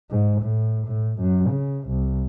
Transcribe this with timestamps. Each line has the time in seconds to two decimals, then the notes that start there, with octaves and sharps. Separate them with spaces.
0.10 G#2
0.41 A2
0.86 A2
1.20 F#2
1.49 C#3
1.88 C2